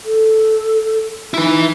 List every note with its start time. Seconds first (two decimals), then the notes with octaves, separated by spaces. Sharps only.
0.05 A4
1.34 D#4 E4 B4